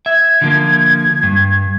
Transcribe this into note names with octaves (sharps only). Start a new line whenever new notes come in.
E5 G#6
D3 F3 A#3
G2